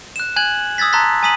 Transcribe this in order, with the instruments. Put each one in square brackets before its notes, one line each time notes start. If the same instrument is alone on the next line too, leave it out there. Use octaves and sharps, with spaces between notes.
[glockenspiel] F#6 E7
G#5 F#6 G#6 F#7
D#6 E6 G#6 A6 B6
A5 A#5 C6 F#6 A6 B6
G#5 A#5 D#6 B6 D#7 F#7